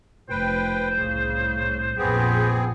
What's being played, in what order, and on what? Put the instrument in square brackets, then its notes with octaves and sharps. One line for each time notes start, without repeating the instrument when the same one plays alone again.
[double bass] F1 [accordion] B4 G5 [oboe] C5
[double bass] C2 A2 [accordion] C#3
[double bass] A#1 F2 [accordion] B3 C4 G#4 [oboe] G4